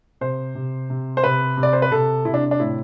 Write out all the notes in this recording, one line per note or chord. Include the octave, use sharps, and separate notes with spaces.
C3 C5
C3
C3
C5
C3 B4
C3
D5
C5
B4
C3 A4
C3 E4
D4
D4
A2 E4